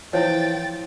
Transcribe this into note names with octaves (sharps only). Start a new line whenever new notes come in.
E3 F3 E4 C5 C#5 G5 A6